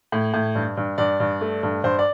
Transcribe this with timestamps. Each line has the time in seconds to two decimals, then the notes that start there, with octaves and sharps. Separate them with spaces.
0.12 A2
0.34 A2
0.55 G2
0.77 G2
0.98 G2 D5
1.20 G2
1.41 A3
1.63 G2
1.84 G2 C5
1.99 D5